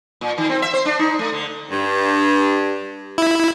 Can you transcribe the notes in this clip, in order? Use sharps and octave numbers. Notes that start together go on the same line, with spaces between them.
A#2
D#3
C4
E5
C5
D4
D#4
A3
D3
G2
E4